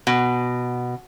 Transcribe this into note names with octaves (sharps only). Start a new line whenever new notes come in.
B2